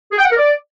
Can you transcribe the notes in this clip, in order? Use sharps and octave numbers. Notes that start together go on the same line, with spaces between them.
G#4
G5
F#5
A#4
D5